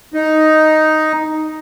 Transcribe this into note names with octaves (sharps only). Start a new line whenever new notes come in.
D#4